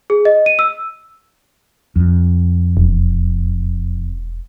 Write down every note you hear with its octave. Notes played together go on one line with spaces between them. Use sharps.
G#4
D#5
D#7
E6
F2
E1